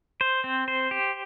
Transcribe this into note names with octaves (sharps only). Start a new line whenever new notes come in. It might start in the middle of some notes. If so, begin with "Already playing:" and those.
C5
C4
C5
G4